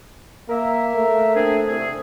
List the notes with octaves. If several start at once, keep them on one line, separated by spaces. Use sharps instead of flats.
A#3 A#4 E5
A3
C4 D4 G#4
C2 C4 G#4